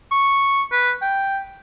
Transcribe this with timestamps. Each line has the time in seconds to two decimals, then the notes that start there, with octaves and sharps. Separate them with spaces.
0.12 C#6
0.72 B4
1.02 G5